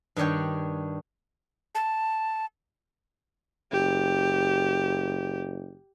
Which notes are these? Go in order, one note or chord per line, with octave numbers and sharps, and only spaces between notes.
G2 D#3 D4 C#5 G5
A5
F#1 G4